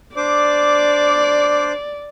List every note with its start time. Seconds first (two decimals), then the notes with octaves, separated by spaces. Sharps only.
0.16 D4 C5 D5 D6